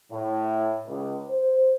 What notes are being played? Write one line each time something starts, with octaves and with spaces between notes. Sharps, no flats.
A2
C#2
C5